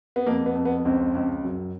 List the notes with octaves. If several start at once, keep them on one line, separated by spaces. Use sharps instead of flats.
B3
F2 A#3
B3
F2
B3
C#2 C4
C#2
F#2